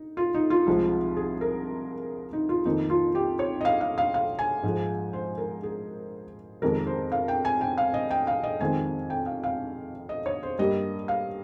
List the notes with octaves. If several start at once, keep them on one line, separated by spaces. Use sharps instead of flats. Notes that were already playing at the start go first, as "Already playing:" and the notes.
Already playing: D#4
F4
D#4
F4
C2 C3 F3 G#3
G#4
A#4
D#4
F4
F2 D#3 A#3 D#4
F4
G4
C#5
D#5
F5
F5
F5
F5
G#5
G#2 F3 G#3
C5
A#4
G#4
F2 C3 D#3 G#3 A#4
C5
F5
G5
G#5
G5
F5
D#5
G5
F5
D#5
F2 D#3 G#3 C4 G#5
G5
F5
F5
D#5
C#5
C5
G2 G3 A#3 D#5
F5